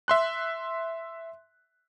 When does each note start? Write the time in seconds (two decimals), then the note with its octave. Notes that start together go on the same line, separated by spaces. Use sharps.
0.08 E5 C6 F#6